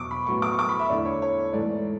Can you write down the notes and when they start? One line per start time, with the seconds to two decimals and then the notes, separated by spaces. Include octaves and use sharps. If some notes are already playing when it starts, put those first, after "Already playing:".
Already playing: E2 B2 F#3 C#6 D6
0.11 B5
0.26 A2 F#3 B3 C#6
0.42 D6
0.54 C#6
0.59 D6
0.69 B5
0.79 E5
0.90 E2 D3 A3 E4 D5
1.05 C#5
1.22 C#5
1.53 G#2 E3 A3 D5